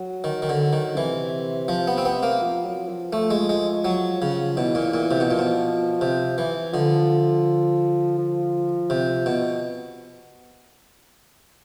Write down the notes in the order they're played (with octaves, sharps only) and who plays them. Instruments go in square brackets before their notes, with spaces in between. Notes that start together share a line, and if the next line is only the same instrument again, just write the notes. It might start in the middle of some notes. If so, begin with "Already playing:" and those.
Already playing: [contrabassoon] F#3
[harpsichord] D#3
D#3
D3
D#3
[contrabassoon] C3 [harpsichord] E3
[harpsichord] F3
B3
C4
B3
A#3
[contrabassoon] F3
F#3
F3
[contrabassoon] F3 [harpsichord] A3
[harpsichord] G#3
G#3
F#3
C#3
[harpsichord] B2 [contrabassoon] E3
[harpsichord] A#2
[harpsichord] A#2 [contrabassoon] E3
[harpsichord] C3
B2
[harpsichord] A#2 [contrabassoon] F3
[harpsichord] B2
C3
E3
[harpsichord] D3 [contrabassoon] F3
[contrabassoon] F3
[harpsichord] C3
B2